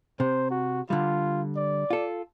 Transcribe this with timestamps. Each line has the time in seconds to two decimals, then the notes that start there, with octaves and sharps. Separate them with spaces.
0.20 C3 C5
0.51 F#4
0.90 D3 G3 F4
1.56 D5
1.90 F4 A4